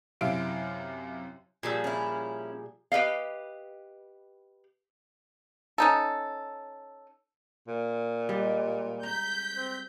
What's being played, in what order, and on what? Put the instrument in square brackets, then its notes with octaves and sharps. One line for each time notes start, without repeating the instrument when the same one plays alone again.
[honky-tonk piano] F#2 C3 E4 F5 D7
[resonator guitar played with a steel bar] A#2 F3 G3 [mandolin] G#4 A5 E6
[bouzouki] C#4 E4
[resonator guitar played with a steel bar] G4 B4 D#5 F5
[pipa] C#4 D#4 A4
[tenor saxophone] A#2
[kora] G3 [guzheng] G#3
[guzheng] A#5 [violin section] G6 B6
[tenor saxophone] C4